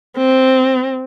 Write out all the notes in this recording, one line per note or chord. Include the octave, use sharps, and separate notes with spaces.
C4